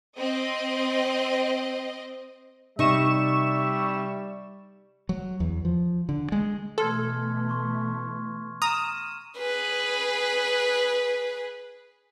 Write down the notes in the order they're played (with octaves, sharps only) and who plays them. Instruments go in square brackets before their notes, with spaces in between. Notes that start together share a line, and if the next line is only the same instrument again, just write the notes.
[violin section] C4 D#5
[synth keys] C3 C#6 E7 [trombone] G3 [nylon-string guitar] D#4 [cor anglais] E5
[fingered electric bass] F#3
E2
F3
D3
G#3
[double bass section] B2 E3 A3 [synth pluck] A4 [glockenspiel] C6 F6 G#6
[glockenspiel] C6 C#6
[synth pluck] A#5 D#6 [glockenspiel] F6 D#7 E7
[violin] G#4 B4